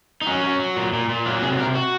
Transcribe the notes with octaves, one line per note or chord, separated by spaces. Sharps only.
D#4
F#3 C#4
F#3
F#3
A#2
A#2
A#2
F#3 F4
C3 G#4
C3 A#4
F#4